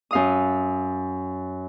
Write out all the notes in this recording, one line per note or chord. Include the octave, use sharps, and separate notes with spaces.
F#2 F5 D#6